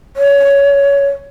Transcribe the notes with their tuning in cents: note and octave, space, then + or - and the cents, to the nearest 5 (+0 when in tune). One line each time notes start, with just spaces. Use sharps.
C#5 +15